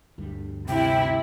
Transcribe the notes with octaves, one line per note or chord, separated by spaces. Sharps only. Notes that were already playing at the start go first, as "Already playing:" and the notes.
D2 G2 G3
C3 E4 G5